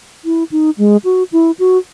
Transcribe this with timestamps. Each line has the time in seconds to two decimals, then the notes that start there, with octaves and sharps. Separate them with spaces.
0.25 E4
0.52 D#4
0.78 G#3
1.04 F#4
1.32 E4
1.59 F#4